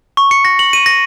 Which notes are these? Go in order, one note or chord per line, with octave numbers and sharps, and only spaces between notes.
C#6
C#7
A#6
F#7
D#7
A#6